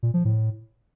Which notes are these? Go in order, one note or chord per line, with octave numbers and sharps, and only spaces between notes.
A#2
F3
A2